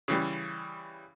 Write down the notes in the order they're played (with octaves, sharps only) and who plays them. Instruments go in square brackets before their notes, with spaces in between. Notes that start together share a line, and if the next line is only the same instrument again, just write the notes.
[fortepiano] C#3 E3 G3